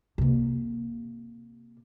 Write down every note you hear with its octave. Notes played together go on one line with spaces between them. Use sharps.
C3 A#3